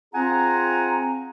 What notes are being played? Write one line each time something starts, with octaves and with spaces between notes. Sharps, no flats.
C4 F4 G#4 F#5 G#5 A#5